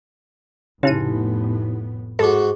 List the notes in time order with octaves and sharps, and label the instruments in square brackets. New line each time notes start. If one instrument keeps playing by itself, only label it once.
[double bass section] F1 A2 B3 [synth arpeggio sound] C#3 D#7 [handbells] D#4 E4 G4
[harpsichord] G#2 F#4 [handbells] G4 D6 [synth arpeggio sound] A4